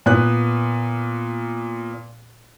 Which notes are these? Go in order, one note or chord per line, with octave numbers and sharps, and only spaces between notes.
A#2 B3 F#6